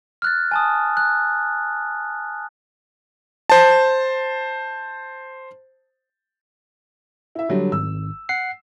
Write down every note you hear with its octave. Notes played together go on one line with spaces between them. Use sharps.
F6 F#6 A6
G#5 A5 D#6
F#6
C5 A5
E4 E5
D3 F#3 G3
G#1 E6
F#5 C7